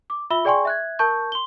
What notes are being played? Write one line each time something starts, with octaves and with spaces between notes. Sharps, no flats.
D6
F4 E5 B5 E6 G7
G#4 D5 G5 G#5 C6 C#6
E5 F#6 G#6
A#4 A5 C#6 G6
C6 G7